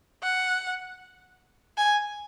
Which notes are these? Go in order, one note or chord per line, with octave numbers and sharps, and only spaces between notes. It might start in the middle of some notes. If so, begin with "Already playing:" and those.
F#5
G#5